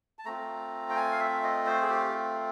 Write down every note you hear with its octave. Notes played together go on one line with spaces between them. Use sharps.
A5
A3 C4 F4 A#5
G5
G#5
F5
E5
D#5
C5
G#4
G4